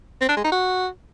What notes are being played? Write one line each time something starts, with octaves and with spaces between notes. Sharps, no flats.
C4
D4
G#3
D#4
F#4